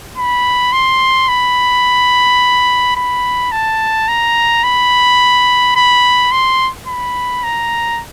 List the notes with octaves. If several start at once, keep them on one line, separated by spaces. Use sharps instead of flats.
B5
C6
B5
B5
A5
A#5
B5
B5
C6
B5
A#5